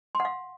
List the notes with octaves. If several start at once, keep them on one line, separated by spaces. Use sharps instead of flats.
C6
F#5
F5